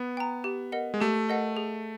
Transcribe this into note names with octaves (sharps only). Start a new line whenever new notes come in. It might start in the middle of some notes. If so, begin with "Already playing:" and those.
Already playing: B3
G5 A#5
G4
A#4 D#5 F#5
G#3
A3 G4
A#4 D#5 F#5
G#4